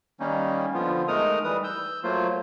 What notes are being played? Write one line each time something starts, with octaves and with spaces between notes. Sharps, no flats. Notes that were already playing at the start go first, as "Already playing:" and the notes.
D#3 G3 A#3 C#4 D#4
D3 F3 B3 F4
G#3 A3 D#4 A#4 A#5 D#6
E3 G3 B4 D#6
E6 G6
F#3 A3 A#3 F4 C5